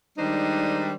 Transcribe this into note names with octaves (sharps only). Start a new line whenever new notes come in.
D#3 G3 G#3 D4 D#4 C5